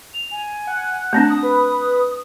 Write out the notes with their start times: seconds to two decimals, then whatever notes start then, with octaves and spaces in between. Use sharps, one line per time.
0.14 F7
0.31 G#5
0.67 F#5
1.13 A3 C4 D4 A5
1.30 D#6
1.43 B4